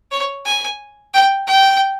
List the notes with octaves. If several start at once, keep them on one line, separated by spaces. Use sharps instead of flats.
C#5
G#5
G5
G5